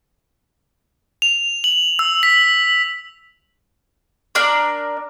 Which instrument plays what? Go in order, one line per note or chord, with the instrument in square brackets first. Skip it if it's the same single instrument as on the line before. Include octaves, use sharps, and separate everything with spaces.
[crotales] F7
F#7
E6
B6
[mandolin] D4 A#4 D5